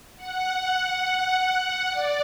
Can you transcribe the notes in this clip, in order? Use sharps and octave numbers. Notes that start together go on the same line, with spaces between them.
F#5
D5